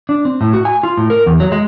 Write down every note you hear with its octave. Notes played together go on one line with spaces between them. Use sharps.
D4
C4
A2
F#4
G#5
F4
A2
A#4
E2
F#3
G#3